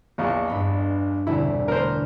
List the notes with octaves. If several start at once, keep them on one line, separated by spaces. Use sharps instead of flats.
A#1 E2 D#5 C#6
G2 B3 B5
E1 C2 D3 E4
A3 B3 D4 A#4 C5